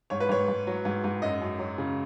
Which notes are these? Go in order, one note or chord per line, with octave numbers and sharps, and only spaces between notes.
G#2 C#5
B4
G#2 C#5
G#2
F#3
G#2
G#2
F#2 D#5
F#2
F#3
C#3